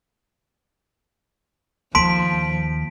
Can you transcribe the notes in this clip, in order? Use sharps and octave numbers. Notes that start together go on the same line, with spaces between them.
D#2 F3 A5 C6 B6 D7